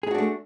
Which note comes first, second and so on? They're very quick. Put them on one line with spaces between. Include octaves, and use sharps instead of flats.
G#4 D#4 F#4 D4 A3